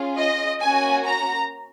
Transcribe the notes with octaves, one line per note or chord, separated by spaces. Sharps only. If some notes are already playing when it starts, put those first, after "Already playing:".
Already playing: C#4 F4 G#4
D#5
A#3 C#4 F#4 G#5
A#5